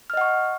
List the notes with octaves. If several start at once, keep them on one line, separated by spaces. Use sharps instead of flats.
D#5 F#5 C#6 F6